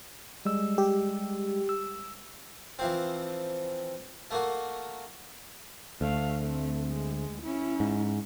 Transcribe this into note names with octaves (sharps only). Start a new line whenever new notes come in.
G3 G#3 E6
G4
E6
E3 F3 C4
A3 A#3 F#4
D2 A3 F5
A3 C4
G#3
C#4 E4
G#2